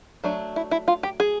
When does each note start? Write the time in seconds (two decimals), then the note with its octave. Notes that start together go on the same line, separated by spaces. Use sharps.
0.24 F#3 A3 D4
0.56 E4
0.71 E4
0.88 F4
1.03 G4
1.20 G#4